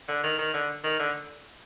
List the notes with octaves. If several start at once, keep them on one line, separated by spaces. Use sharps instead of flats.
D3
D#3
D#3
D3
D#3
D3